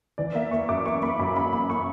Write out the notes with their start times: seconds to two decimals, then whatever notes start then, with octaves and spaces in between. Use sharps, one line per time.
0.18 E3 D5
0.35 A#3 E5
0.51 A#3 C#6
0.69 F#2 D6
0.86 A#3 C#6
1.02 A#3 B5
1.19 F#2 B5
1.36 F#2 B5
1.52 A#3 B5
1.70 A#3 C#6